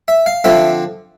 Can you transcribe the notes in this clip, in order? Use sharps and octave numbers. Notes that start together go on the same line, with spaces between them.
E5
F5
D3 F3 C4 E5